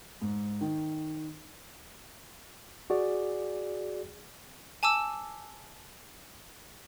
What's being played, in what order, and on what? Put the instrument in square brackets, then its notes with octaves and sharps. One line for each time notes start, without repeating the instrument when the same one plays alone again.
[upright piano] G#2
D#3
[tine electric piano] F#4 G#4 D5
[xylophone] G#5 A5 D6 E6